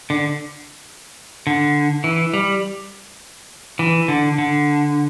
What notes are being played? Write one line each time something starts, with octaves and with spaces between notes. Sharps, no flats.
D3
D3
E3
G3
E3
D3
D3